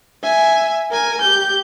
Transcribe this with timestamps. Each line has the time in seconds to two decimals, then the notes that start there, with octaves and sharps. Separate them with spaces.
0.23 E5 G#5
0.91 A#4 G#5
1.21 G4 G6